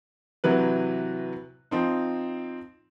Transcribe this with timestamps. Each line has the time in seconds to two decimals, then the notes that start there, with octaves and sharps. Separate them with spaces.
0.44 C3 E3 F#3 B4
1.71 F3 C4 D#4